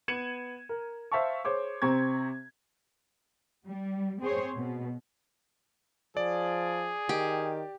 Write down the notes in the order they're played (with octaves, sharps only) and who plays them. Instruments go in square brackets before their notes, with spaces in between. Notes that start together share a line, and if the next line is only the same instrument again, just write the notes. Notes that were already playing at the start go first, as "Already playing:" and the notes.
[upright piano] B3 G#6 C#7 D#7 E7 F#7
A#4
C5 E5 F5 A5 C#6
G#4 C5 C#5 D6
C3 C4 A#5 C#6 G#6
[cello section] G3
C4 G#4 C5 C#5
B2
[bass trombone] F3 [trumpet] G#4 [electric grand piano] D5
[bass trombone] D#3 [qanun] G4